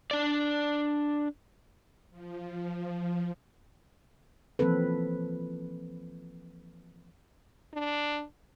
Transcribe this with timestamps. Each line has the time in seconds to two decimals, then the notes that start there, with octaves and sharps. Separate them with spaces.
0.11 D4 D5
2.10 F3
4.59 E3 F3 A#3 C4 A4 B4
7.73 D4